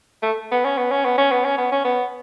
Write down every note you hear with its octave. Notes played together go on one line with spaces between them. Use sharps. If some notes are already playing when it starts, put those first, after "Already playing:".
A3
B3
C#4
B3
C#4
B3
C#4
B3
C#4
B3
C#4
B3